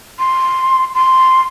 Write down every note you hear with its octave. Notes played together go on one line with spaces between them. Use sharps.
C6
C6